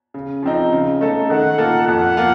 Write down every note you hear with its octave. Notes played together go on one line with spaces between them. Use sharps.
C#3
F3 C4 D#4
C#3
A3 D#4 A4
D#3 F#5
A#3 F4 A4
F2 F#5
A#3 F4